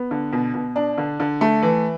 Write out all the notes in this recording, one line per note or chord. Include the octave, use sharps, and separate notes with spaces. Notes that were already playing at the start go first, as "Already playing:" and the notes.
Already playing: B3
D3
B2
B2
D4
D3
D3
A3
E3